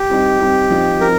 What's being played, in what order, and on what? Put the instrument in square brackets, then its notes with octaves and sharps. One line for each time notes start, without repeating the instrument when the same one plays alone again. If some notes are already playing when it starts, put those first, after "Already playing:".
Already playing: [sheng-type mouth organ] G4
[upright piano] G3 C4 D#4
G3 C4 D#4
F3 C4 D#4
[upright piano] F3 C4 [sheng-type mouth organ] A#4